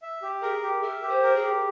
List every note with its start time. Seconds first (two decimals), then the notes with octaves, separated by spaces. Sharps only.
0.02 E5
0.22 G4
0.42 G#4 A#4
0.63 G4
0.83 A#4 E5
1.02 G4
1.09 C5
1.23 A#4
1.36 G#4
1.43 G4